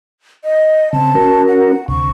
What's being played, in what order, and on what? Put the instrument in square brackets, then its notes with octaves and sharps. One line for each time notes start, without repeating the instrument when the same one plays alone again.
[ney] D#5
[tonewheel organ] C#3 C4 [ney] A5
[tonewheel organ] C#4 F#4 A#4
[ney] F#5
[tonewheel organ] D2 C3 [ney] C#6